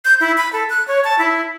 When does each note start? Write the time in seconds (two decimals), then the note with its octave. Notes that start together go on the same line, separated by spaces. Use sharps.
0.05 G6
0.20 E4
0.38 B5
0.53 A4
0.70 F#6
0.88 C#5
1.04 A5
1.19 E4